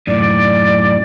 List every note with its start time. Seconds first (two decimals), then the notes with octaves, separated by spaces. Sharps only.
0.07 F#2 A2 D5